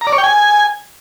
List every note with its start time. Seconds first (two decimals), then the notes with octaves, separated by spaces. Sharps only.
0.01 A#5
0.07 D5
0.12 C#5
0.18 G5
0.24 G#5